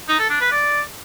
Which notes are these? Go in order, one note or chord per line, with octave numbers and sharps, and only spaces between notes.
D#4
A4
D4
B4
D5